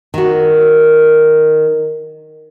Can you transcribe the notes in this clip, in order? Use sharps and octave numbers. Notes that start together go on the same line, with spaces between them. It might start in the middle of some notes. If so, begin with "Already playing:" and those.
D#3 F#4